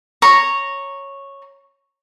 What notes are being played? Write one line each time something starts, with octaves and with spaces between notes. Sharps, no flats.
C#5 A#5